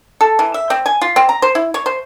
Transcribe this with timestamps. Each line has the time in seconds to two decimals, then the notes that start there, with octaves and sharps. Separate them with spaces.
0.21 A4
0.39 E3
0.54 E5
0.70 C4
0.86 G#5
1.01 F4
1.16 C4
1.29 A#5
1.42 C5
1.55 E4
1.74 C#5
1.86 C5